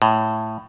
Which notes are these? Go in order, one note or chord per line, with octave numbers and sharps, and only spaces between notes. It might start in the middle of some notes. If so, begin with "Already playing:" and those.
A2